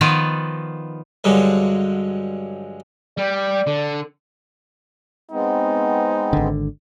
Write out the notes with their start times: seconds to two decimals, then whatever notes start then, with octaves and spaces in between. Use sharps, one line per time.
0.01 D#3 F3 B3 D#4 B4 D5
1.24 G2 D3 F#3 G#3 D4
3.18 G3 G4 D5
3.67 D3
5.31 G#3 B3 C4 D#4
6.33 G#1 D3